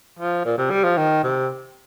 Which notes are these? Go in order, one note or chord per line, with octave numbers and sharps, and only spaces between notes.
F3
A#2
C3
G3
F3
D#3
C3